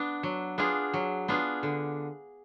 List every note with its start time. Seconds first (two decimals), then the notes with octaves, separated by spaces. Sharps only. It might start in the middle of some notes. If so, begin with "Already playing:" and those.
Already playing: B3 D4
0.23 F#3
0.58 B3 D4 F4 G#4
0.94 F#3
1.28 B3 D4 F4 G#4
1.63 D3